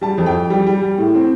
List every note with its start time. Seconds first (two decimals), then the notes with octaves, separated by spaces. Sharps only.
0.01 G3 A5
0.18 F2
0.26 G5
0.34 F2
0.50 G3
0.67 G3
0.82 G3
0.98 A2
1.15 C4